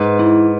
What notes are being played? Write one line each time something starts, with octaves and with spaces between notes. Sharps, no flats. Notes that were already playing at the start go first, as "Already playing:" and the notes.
Already playing: G#2 B4
E4